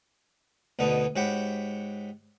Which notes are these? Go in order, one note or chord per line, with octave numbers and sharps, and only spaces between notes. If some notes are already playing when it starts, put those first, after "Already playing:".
D2 B2 D3 B3 D#4
G#2 F#4 G4 C#5 G5 B5